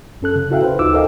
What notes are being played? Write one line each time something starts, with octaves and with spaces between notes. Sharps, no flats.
F#2 C#4 A4 F#6
C#3
E4 F#4 A4 E5 F5 G5
B4 C5
D2 D#4 F4 D6 E6
A4 A#4 C5 D#5 F5 G5